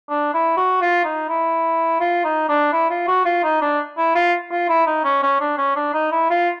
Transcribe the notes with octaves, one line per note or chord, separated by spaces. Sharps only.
D4
E4
F#4
F4
D#4
E4
F4
D#4
D4
E4
F4
F#4
F4
D#4
D4
E4
F4
F4
E4
D#4
C#4
C#4
D4
C#4
D4
D#4
E4
F4